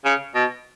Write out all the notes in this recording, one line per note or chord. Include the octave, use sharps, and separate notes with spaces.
C#3
B2